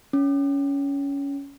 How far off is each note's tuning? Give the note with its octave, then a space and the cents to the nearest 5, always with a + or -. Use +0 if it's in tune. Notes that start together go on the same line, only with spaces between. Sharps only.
C#4 +15